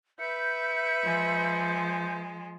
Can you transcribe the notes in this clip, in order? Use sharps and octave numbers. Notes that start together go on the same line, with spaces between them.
B4 E5 G6 C#7
F3 G#3